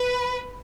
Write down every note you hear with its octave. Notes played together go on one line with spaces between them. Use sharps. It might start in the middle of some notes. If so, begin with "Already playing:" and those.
Already playing: B4